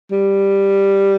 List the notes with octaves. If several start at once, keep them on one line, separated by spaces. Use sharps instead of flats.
G3